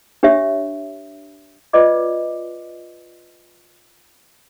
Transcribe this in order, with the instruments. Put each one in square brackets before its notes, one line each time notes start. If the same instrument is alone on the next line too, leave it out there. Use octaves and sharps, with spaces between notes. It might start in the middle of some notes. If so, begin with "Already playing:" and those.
[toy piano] D4 G4 C#5 E5
F4 B4 D5 D#5 D6